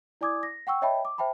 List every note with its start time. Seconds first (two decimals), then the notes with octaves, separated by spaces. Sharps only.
0.21 E4 D5 G#5 D6 D#6 G#6
0.43 A#6
0.67 F#5 G5 C#6 E6
0.82 C#5 D#5 E5 G5 A5 B5
1.05 D6
1.18 C5 E5 G5 A5 B5